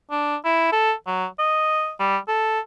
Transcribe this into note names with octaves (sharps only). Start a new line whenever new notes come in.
D4
E4
A4
F#3
D#5
G3
A4